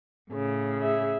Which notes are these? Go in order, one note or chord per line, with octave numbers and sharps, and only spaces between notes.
A2 C#3
G#4 E5